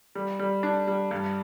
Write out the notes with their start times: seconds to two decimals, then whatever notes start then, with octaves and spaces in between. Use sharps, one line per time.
0.15 G3
0.39 G3
0.63 D4
0.88 G3
1.11 G2